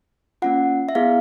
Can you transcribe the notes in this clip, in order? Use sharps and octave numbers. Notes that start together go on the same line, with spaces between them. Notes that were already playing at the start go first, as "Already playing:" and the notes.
A#3 C#4 F4 F#5
E5
B3 E4 G#4 F5